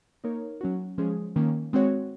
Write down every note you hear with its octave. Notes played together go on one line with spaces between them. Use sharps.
A#3 D#4 A#4 C#5
F#3 C#4 F#4
F3 G#3 C#4 G#4
D#3 A#3 C#4
G#3 C4 F#4 C#5